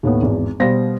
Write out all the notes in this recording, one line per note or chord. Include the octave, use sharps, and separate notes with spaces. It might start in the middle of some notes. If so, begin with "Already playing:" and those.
D#2 A2 B3
G#1 E2
B2 G3 C5 F5 A#6